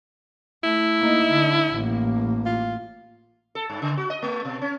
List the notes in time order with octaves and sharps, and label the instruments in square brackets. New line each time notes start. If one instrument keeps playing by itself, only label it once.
[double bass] A3 [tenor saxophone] E4
[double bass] A#3 D#4
D3
A1 A#3
[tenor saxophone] F4
[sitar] A4
G2
C#3
F#4
D#5
A3
B2
C#4